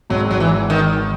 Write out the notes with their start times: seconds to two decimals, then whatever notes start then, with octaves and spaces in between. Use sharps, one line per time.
0.10 G#1 G#2 F#3
0.31 F#3
0.40 E3
0.70 D#3